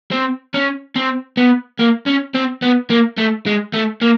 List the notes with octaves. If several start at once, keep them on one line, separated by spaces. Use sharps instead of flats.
C4
C#4
C4
B3
A#3
C#4
C4
B3
A#3
A3
G#3
A3
A#3